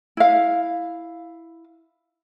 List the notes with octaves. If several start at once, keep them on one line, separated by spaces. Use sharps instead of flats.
E4 F5